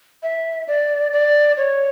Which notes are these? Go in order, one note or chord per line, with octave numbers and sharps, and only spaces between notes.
E5
D5
D5
C#5